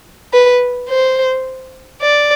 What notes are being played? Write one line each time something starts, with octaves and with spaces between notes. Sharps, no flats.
B4
C5
D5